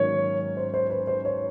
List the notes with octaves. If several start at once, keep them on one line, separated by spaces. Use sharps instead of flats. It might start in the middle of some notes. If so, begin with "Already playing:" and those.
Already playing: G#2 D#3 F#3 A#3 C#4 C#5
C5
C5
B4
C5
C#5